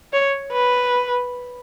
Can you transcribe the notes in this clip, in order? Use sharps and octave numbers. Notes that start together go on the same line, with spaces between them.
C#5
B4